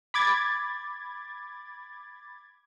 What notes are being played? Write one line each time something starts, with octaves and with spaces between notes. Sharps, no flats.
B5 D6 G#6 A6